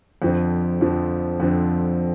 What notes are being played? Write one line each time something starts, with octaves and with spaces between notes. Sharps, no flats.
F2 D3 F3 C4
F2 D3 F3 C4
F2 D3 F3 C4